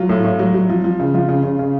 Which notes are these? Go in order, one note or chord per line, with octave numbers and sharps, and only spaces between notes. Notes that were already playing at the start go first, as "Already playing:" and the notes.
Already playing: F#3 F4
A2
A2
F#3
F#3
F3
F3
C#3
F3 F4
C#3
C#3
C#3